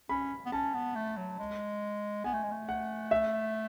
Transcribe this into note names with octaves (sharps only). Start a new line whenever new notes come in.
C#4 B5
B3
C#4 A5
B3
A3
F#3
G#3
B3 G#5
A3
G#3
A3
F#5
E5